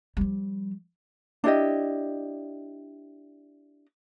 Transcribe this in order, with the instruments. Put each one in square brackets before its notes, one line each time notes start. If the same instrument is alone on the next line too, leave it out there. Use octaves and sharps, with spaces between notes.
[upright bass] F3 G3
[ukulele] D4 E4 G4 D#5